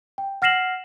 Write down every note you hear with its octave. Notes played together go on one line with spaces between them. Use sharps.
G5
F#5 F6 A#6 C7 E7 F#7